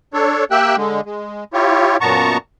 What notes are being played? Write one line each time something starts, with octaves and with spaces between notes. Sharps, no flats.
D4 A4 C#5
A#3 G4 E5 G5 E6 F#6
D3 G#3
G#3
E4 F4 G4 C#5
F#2 A#2 B3 A5 A#5 C#6